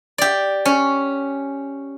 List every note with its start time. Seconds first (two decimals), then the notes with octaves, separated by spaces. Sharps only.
0.18 G4 D5
0.65 C#4